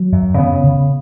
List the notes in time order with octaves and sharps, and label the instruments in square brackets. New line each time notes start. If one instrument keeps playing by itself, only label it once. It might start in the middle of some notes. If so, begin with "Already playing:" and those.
Already playing: [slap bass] F#3
F#2
C#3 B3
C#3